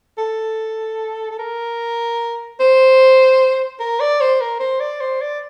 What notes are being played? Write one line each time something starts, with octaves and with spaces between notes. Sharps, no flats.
A4
A4
A#4
C5
A#4
D5
C5
A#4
C5
D5
C5
D5